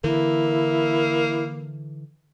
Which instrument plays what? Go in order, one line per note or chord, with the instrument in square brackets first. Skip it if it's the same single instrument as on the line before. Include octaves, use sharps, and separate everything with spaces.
[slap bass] D3 E3 [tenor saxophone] A#3 [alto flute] E4